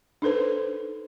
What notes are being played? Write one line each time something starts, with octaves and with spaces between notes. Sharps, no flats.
D4 D#4 A4 B4 C5